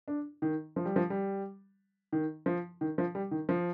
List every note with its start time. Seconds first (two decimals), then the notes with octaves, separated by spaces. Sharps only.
0.08 D4
0.42 D#3
0.76 F3
0.85 G3
0.96 F3
1.10 G3
2.12 D#3
2.46 F3
2.81 D#3
2.98 F3
3.15 G3
3.31 D#3
3.49 F3